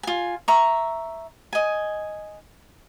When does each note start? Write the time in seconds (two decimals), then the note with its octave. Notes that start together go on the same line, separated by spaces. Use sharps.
0.03 F4 G#5
0.48 E5 A#5 C#6
1.53 D#5 G#5